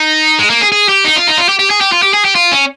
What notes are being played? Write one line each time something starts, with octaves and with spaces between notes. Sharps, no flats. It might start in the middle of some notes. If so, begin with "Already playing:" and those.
Already playing: D#4
G#3
A#3
G#4
G#4
G4
D#4
F4
D#4
F4
G4
G4
G#4
G4
F4
G4
G#4
G4
F4
C#4